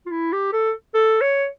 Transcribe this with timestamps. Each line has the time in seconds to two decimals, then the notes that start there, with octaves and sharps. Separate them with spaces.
0.06 F4
0.11 E4
0.33 G4
0.53 A4
0.95 A4
1.21 C#5